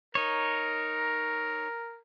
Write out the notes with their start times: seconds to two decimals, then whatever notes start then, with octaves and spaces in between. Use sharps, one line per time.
0.15 D#4 A#4 C#5